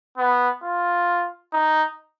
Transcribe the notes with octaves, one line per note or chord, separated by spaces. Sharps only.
B3
F4
D#4